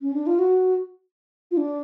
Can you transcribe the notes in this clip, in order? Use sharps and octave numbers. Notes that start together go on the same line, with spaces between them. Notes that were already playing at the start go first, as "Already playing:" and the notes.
C#4
D4
F4
F#4
F4
D4